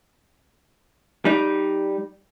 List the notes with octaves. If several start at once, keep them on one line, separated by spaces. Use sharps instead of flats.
G3 D#4